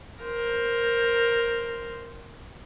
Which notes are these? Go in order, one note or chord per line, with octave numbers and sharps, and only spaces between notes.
A#4 C5